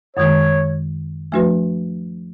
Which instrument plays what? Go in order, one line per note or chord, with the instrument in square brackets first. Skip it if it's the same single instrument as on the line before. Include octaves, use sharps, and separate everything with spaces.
[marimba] F#2 D#3 G#3 [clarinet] C#5
[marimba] F3 A3 D4 F#4 B4